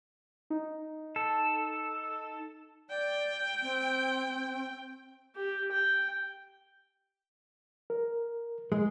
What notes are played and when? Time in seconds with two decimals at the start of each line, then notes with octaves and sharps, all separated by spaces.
0.50 D#4
1.16 A4
2.90 D5 G5
3.62 C4
5.35 G4
5.72 G5
7.90 A#4
8.72 G#3